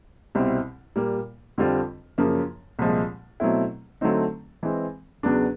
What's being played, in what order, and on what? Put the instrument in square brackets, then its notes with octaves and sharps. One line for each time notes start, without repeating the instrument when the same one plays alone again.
[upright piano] C2 B2 G3 C4 E4
A#2 G3 A#3
F2 D3 G3 C4 F4
F#2 C#3 F3 A#3
C2 A#2 F3 G#3
B2 F#3 A3 C4 E4
D3 F#3 A3 C4 D#4
E3 G#3 C4
E2 C#3 F#3 B3 D4